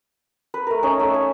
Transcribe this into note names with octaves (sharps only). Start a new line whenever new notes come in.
B4
A3 A#4
C#4 D#4
A3 E5
G#5